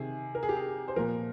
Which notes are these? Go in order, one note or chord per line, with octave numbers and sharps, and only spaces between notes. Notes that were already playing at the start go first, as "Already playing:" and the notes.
Already playing: C3 D#3 G#4
A#4
G#4
G4
G#4
C5
A#2 F3 A#4